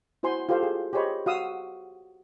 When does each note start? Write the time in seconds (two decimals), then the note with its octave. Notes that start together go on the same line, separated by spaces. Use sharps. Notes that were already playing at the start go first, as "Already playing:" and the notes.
0.23 E4 F#4 C5 G#5 C6
0.49 F4 G4 A4 C5 F5
0.63 G#4
0.93 G4 G#4 C5 C#5 D#5 B5
1.26 F#4 F5 D#6 E6